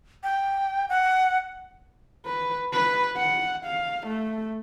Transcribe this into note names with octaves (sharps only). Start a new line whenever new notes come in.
G5
F#5
B4
B4
F#5
F5
A3